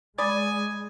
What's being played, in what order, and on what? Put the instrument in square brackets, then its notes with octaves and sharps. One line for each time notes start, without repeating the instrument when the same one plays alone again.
[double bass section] G#3 [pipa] D5 B5 [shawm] G#5 [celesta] D#6 A6